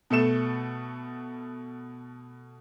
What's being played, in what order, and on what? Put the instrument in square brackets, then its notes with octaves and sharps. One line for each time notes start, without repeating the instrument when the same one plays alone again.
[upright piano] B2 A3 A4 E7